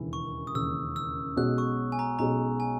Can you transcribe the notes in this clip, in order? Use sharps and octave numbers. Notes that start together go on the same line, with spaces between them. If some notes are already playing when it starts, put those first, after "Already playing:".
Already playing: E1 D#2 C#3 E3
C#6
D#6
E1 D#2 C#3 E3 E6
E6
B1 B2 G#3 C#4 F#4 F#6
C#6
G#5
A#5
B1 B2 G#3 C#4 F#4 A#5
G#5